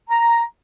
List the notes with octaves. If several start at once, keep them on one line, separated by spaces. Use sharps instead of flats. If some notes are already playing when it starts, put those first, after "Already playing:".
A#5